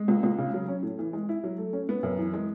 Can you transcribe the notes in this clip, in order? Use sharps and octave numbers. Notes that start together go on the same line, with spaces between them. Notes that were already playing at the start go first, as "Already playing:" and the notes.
Already playing: G#3
C#2
C#2
C#3
F#3
C#4
A2
E3
G#3
E4
F#3
A3
C#4
B3
F#2
E3
G#3